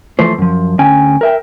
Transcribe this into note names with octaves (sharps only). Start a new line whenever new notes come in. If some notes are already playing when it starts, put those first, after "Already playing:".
E3 F3 A3 C5
F#2 F3
D2 C#4 G5 G#5
A#4 E5 G5